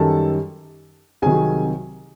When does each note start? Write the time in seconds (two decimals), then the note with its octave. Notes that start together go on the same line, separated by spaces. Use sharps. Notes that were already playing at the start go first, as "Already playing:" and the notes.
Already playing: F#2 D#3 G3 A4 A5
1.22 C2 C3 D#3 F#3 G#4 G#5